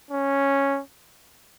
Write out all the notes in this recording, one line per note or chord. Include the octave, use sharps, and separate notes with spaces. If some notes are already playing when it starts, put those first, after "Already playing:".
C#4